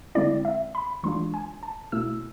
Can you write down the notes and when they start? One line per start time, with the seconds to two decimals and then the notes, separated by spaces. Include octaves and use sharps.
0.15 D3 G#3 C4 E4 D5
0.45 E5
0.75 B5
1.03 E3 G#3 D4 F4 C6
1.34 G#5
1.63 A5
1.92 B2 A3 E4 E6